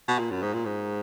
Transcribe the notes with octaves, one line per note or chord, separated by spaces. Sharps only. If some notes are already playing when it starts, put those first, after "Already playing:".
B2
A#2
F#2
G#2
A#2
G#2